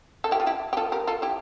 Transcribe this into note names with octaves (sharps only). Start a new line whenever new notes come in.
A4
E4 G4
F4
E4 G4
G4
F4 A4
G4 A#4
F4 A4
E4 G4